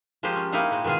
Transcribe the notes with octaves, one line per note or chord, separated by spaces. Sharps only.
F3 G#3 F4 G4 A#4 C5
C#4
A#3 C4 D#4 E4 F5 F#5
A#2 G#3 C4
B2 D#3 G#3 F4 G#4